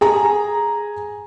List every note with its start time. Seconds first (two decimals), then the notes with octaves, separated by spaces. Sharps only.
0.01 G#4 G#5 A#5